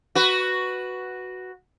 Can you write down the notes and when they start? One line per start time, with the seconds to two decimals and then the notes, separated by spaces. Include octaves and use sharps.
0.15 F#4 B4